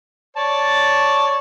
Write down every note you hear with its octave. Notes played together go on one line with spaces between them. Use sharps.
C#5 D5 A5